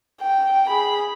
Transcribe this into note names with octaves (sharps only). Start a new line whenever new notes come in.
G5
G#4 B5